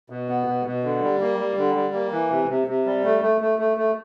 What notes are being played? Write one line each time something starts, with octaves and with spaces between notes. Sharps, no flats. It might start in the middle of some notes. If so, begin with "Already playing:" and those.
B2
B3
B2
B2
D3
G3
A#3
G3
D3
G3
A#3
E3
C3
C3
C3
G3
A3
A3
A3
A3
A3